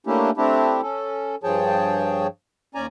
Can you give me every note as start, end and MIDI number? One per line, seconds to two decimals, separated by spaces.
0.07 0.30 57
0.07 0.30 58
0.07 0.30 61
0.07 0.30 62
0.07 0.30 64
0.07 0.30 67
0.37 0.81 57
0.37 0.81 60
0.37 0.81 62
0.37 0.81 64
0.37 0.81 67
0.82 1.36 61
0.82 1.36 69
1.43 2.27 43
1.43 2.27 53
1.43 2.27 68
1.43 2.27 73
1.43 2.27 79
1.43 2.27 81
2.75 2.86 39
2.75 2.86 61
2.75 2.86 74
2.75 2.86 80
2.75 2.86 82